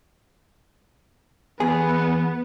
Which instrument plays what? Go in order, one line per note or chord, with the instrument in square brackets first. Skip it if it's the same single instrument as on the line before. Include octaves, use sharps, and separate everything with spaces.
[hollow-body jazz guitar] E2 G#4 G#5 [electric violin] B3